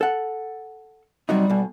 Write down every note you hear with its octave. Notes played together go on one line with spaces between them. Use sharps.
A4 F#5
C3 F#3 G3 D#4
B1 B2